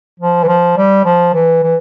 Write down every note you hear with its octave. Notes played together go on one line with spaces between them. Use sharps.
F3
E3
F3
G3
F3
E3
E3